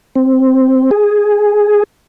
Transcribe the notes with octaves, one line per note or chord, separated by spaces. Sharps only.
C4
G#4